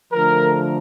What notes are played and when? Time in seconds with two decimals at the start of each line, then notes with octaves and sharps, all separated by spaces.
0.13 D3 F3 A3 A#4